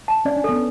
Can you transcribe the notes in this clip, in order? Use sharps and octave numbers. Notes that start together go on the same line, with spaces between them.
A5
C#4 D5
D4
B3 C#4 A4